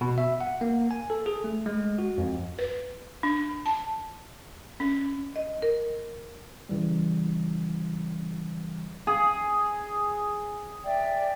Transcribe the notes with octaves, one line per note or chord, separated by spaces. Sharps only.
B2
E5
F#5
A#3
G#5
A4
G#4
A3
G#3
F#4
F2
B4
D4
A5
C#4
D#5
A#4
C#3 E3 G3
G#4
D5 E5 G5